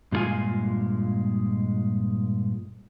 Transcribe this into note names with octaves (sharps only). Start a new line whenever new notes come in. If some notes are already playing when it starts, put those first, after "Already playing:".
G2 A#2 D#3 G#3 F4 G#5